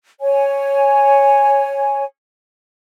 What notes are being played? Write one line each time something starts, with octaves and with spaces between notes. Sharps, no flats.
C#5 G#5